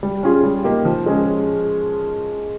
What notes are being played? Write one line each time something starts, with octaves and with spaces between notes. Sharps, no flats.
G3
C#4 F4 G#4
G3
A#3 D#4 G4
F3
G#3 C#4 G#4